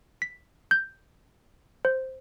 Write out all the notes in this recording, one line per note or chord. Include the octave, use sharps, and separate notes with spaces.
B6
G6
C5